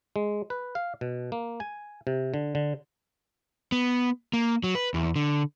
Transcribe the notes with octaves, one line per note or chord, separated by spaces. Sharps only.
G#3
B4
F5
B2
A#3
G#5
C3
D3
D3
B3
A#3
F#3
B4
E2
D3